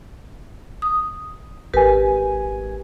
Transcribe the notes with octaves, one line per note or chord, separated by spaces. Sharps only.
D#6
G#1 G4 A#4 B4 G#5